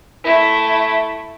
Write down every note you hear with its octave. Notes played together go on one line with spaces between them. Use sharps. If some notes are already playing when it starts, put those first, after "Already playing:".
A3 E4